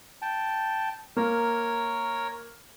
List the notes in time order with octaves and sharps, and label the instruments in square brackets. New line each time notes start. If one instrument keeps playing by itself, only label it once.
[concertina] G5 A5
[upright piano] A#3 [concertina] A#4 C#5